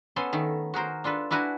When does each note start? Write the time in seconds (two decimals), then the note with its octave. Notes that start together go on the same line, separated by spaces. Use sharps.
0.16 B3 C#4 A4 G#5 C6
0.33 D#3 A3 D#4
0.74 F#4 G#4 A#4 C5
1.04 D4 F4 A4 B4
1.30 D4 E4 F#4 B4 G#5 A#5